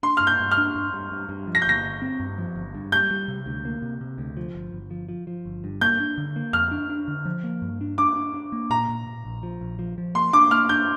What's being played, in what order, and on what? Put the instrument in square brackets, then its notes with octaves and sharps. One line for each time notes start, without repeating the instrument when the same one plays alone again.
[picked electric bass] D4 [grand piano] C6
[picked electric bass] G2 [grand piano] F6
[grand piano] G6
[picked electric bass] G2
[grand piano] F6
[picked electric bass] D4
G2
G2
G2
G2
F3
[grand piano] A#6
G6
[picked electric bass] G1 [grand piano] A#6
[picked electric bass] G1
C4
G2
F3
G1
G2
[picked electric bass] G3 [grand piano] G6
[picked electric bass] G3
C3
D2
A#3
C3
C3
D2
F3
G1
G1
F3
F3
F3
G1
G2
[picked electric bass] A#3 [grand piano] G6
[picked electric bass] D4
D3
A#3
[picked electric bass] F2 [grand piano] F6
[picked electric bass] D4
D4
D3
F3
A#3
G2
D4
[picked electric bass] D4 [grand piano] D6
[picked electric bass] D4
D4
A#3
[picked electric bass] A#2 [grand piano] A#5
[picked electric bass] A#2
A#2
A#1
F3
A#1
F3
F3
[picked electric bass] A#3 [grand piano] C6
[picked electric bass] D4 [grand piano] D6
[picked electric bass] A#3 [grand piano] F6
[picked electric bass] D4 [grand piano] G6